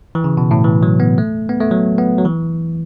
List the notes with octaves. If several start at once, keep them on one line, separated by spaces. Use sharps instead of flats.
E3
C#3
B2
A2
E3
F#3
B3
A3
B3
A3
F#3
B3
F#3
E3